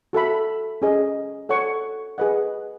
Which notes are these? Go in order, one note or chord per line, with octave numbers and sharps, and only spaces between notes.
F#4 A4 E5 B5
C#4 G#4 D#5
A4 C#5 F#5 C#6
G#4 B4 D#5 F#5